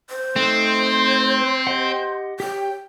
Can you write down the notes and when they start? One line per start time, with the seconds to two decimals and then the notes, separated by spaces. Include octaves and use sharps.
0.10 C5
0.36 A3 C4 D#4 C6 F#6 G6
1.67 G4 D#5 F#5
2.40 G4 C#5 G5